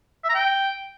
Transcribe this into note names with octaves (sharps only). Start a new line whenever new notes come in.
E5
A#5
G5